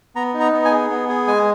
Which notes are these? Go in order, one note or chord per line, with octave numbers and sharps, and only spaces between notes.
B3 A#5
D#4
A#5
B3
G#5
G#4
B3
G#4
G#3 G#5